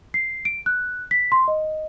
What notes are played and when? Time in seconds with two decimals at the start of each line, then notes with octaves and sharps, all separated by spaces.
0.14 C7
0.45 D7
0.66 F#6
1.11 B6
1.32 C6
1.48 D#5